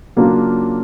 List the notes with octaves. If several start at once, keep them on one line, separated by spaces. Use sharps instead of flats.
C#3 F#3 A#3 D4 F4